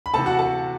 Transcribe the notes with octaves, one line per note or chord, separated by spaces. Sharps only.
B5
D2 C3 E3 A4 A5
F#4 F#5
A4 A5